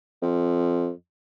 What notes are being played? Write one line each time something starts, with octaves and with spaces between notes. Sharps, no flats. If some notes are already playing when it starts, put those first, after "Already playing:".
F2